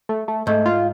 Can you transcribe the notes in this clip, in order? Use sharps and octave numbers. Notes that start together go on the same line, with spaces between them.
A3
A3
G#2 A3
F4